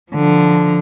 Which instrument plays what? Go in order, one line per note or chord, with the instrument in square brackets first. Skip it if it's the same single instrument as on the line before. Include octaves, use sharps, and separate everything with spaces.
[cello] D3 F3